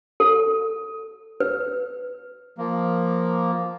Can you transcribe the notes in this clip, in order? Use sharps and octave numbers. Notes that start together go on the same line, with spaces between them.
A4
B4
F3 A#3